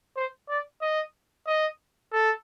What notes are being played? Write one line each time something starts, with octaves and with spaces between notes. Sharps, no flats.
C5
D5
D#5
D#5
A4